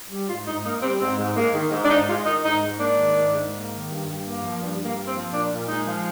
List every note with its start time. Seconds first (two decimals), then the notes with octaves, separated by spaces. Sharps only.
0.10 G3
0.29 G#2 F4
0.46 G#2 D#4
0.65 A#3 D#4
0.82 G3 C4
1.01 G#2 C4
1.19 G#2
1.36 G#3 A#3
1.55 D#3
1.72 G#2
1.85 D4
1.90 G#2 D#4
2.08 G#3 F4
2.26 D#3 D#4
2.44 G#2 D#4
2.63 G#2
2.80 A#3 D4
2.99 D#3
3.16 G#2
3.35 G#2
3.53 A#3
3.70 D#3
3.88 G2
4.07 G2
4.24 A#3
4.43 F3
4.60 G2
4.78 G2
4.85 A#3
4.96 A#3
5.08 C4
5.15 F3
5.32 A#2 D4
5.51 A#2
5.68 G#3 D#4
5.86 F3